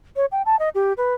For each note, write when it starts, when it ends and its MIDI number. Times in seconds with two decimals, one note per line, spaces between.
0.16 0.26 73
0.32 0.42 79
0.46 0.58 81
0.59 0.69 75
0.75 0.93 67
0.97 1.14 71